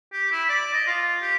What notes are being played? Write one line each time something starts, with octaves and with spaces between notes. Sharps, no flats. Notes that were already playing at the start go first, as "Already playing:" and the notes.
G4
E4
D5
D#5
F4
G4